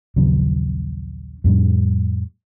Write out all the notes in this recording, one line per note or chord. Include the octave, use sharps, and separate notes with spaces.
A#1 D#2 C#3 F#3
F2 A2 G3